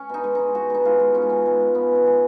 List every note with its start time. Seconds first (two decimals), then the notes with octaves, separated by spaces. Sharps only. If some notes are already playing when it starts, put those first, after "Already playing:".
Already playing: C#4
0.09 B2 D#4
0.24 G#3
0.35 G#3 D#4
0.55 B2 F#4
0.70 B2 D#4
0.85 G#3 F4
1.00 G#3
1.15 B2 C#4
1.22 D#4
1.29 B2 C#4
1.46 G#3
1.60 G#3
1.75 B2 B3
1.91 B2 C#4
2.06 G#3